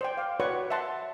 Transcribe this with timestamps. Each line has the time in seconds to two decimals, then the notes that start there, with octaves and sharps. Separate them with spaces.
0.01 C5 D5 G5
0.17 F5 D6
0.40 F#4 B4 C#5 D5 F#5 C#6
0.70 E5 F#5 A5 C6